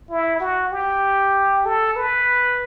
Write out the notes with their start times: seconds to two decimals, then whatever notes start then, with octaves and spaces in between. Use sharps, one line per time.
0.10 E4
0.40 F#4
0.72 G4
1.65 A4
1.96 B4